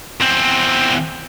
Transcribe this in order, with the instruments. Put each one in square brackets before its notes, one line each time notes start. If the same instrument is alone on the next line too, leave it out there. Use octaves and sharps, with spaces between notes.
[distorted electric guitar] E2 C4